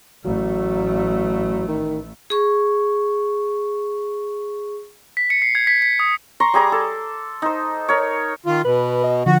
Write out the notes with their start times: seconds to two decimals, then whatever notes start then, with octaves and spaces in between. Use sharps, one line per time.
0.25 A1 F#3 A3
1.68 D#3
2.30 G#4 C#6
5.17 B6
5.30 C#7
5.42 C7
5.55 G#6
5.67 B6
5.82 B6
5.99 D#6
6.40 A#5 C6 C#6
6.54 G3 G#4 A#5 D6
6.72 A4
7.42 D#4 C5
7.88 A#4 C#5
8.46 D#3 F4
8.65 B2 B4
9.04 D#5
9.26 D3 F3 F#4